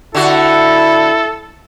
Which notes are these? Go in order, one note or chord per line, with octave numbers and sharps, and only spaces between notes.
D3 E4 F#4 A4